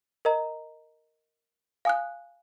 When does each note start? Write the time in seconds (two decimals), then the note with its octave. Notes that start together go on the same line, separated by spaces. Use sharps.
0.25 A#4 D#5 A#5
1.85 F5 G#5 D#6 F#6